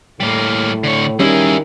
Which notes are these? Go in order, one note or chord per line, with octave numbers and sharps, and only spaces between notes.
A2 G3 A#3
D3 C#5
A#2 D#3 G3 C#4 E4 G#4